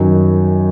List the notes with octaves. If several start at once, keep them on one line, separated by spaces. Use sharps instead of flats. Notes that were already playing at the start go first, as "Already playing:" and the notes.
Already playing: F#2 D#3 F#3